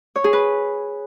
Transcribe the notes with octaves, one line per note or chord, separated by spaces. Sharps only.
C#5
G#4
B4